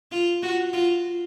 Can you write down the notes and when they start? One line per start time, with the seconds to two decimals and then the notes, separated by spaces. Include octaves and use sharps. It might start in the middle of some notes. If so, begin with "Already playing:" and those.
0.11 F4
0.42 F#4
0.73 F4